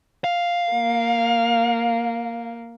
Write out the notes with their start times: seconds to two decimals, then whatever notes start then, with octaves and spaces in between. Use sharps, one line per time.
0.24 F5
0.72 A#3